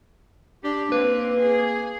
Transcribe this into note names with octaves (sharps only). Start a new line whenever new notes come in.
D4 G4
A#3 C4 B4
G#4